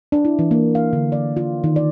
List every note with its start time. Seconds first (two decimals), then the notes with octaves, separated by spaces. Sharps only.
0.12 D4
0.25 E4
0.39 E3
0.51 A#3
0.75 F5
0.93 D3
1.12 D5
1.37 F4
1.64 D#3
1.76 D5